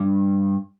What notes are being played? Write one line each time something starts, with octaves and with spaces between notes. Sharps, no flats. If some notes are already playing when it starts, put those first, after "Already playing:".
Already playing: G2